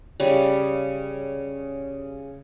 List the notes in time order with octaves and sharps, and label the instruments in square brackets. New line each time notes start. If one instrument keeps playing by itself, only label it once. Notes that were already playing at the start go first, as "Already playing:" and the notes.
[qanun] C#3 G3